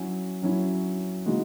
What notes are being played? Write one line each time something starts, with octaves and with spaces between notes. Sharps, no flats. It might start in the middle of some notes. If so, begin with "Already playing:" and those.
Already playing: F#3 C#4 E4
F#3 C#4 E4
C#3 E3 G#3 D#4 F#4